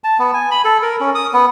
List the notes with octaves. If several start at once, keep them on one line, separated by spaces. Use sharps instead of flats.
A5
B3
G#5
B5
A4
A#4
C#4
D#6
B3